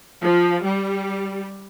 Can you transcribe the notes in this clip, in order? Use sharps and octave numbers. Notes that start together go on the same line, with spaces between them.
F3
G3